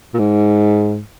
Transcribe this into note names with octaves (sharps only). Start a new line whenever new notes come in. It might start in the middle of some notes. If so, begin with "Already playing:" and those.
A#2
G#2